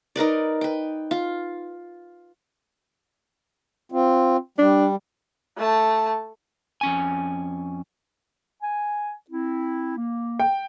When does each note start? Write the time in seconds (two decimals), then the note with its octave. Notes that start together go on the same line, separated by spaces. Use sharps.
0.16 D#4 A#4 B4 D5
0.61 B4 G5
1.11 F4
3.92 C4 F4
4.58 G3 D4
5.57 A3 A5
6.81 F2 C#4 G#5
8.61 G#5
9.30 C4 E4
9.97 A#3
10.40 G5